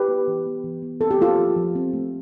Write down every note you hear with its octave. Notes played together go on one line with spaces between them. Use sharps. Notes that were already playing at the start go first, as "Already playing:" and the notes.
Already playing: G4 B4
B3
E3
B3
E3
B3
C4 A4
G4
A3 F4 A4
F3
F3
C4
A3